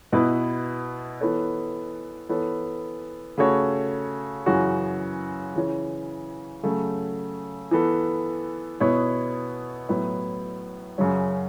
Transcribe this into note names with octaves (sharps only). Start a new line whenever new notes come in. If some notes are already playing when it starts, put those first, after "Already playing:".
B2 B3 E4 B4
E3 B3 A4 C#5
E3 B3 A4 C#5
C#3 A3 F#4 C#5
F#2 C#3 E3 C#4 F#4
C#3 E3 C#4
C#3 F#3 A3
E3 B3 A4
B2 B3 E4 C#5
A2 F#3 B3 E4
F#2 C#3 F#3 C#4